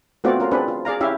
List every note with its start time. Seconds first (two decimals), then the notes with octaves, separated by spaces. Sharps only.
0.24 A3 B3 C4 F4 F#4 D5
0.40 C#4 F4 A#4
0.51 C4 D4 G#4 B4
0.68 F4
0.85 G#4 D5 F5 A#5
1.01 C#4 E4 G4 E5 F5